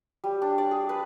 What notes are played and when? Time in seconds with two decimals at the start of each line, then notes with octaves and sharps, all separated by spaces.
0.24 G3
0.42 D4
0.58 D5
0.71 G#4
0.89 B4